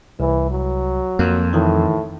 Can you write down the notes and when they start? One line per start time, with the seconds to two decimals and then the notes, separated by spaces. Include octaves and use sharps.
0.20 C2 E3
0.51 F#3
1.19 F2 A#3
1.53 A2 D#3 E3